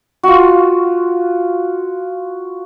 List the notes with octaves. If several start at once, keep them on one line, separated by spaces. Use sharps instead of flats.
F4 F#4